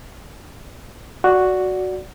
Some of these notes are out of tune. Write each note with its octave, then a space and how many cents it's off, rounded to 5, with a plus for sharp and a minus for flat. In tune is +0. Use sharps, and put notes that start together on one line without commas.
F#4 +0 D5 -10